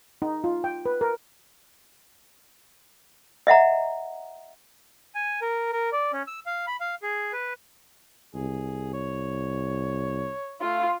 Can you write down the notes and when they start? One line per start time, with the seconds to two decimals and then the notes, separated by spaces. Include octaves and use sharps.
0.22 D#4
0.44 F4
0.64 G5
0.86 B4
1.01 A#4
3.47 D#5 E5 F#5 A#5
5.15 G#5
5.42 A#4
5.72 A#4
5.92 D5
6.13 C#4
6.27 E6
6.46 F5
6.67 B5
6.80 F5
7.03 G#4
7.33 B4
8.35 C2 G#4
8.94 C#5
10.63 A3 F4